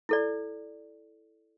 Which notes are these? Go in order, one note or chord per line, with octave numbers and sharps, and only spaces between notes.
E4 A4 D5